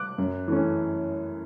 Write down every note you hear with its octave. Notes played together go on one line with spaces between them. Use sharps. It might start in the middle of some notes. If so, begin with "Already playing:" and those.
Already playing: D6 F#6
F#2
E3 A3 C#4